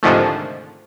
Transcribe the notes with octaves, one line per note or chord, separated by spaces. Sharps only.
C2 G#2 D3 D#3 F3 A3